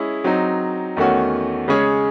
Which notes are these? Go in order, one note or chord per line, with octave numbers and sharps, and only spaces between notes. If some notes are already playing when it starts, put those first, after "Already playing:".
Already playing: G#3 C#4 E4 G#4
F#3 C4 D#4
E2 D#3 A3 C#4 F#4
C#3 G#3 C#4 G#4 C#5